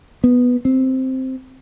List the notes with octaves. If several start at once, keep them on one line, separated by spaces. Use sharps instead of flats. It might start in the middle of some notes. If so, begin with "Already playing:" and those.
B3
C4